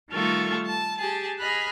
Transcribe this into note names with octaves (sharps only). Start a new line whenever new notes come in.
D#3 G3 A3 F4 A4 C#6
A5
G4 G#4 A5
G#4 D#5 B5 F6 F#6